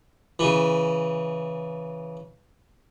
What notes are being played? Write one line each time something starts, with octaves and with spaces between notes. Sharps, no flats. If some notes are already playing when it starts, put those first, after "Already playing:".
C#3 E3